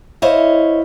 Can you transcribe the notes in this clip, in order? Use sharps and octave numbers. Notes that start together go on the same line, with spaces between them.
E4 C5 C#5 D#5 F5